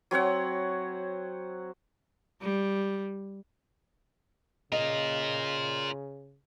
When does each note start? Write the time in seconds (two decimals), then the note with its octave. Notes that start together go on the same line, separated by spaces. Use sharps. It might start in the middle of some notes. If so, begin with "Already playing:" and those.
0.11 F#3 C4 C#5 F#5
2.41 G3
4.72 C#3 F4 A#4 D#5